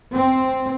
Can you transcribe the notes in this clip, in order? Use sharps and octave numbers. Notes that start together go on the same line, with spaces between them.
C4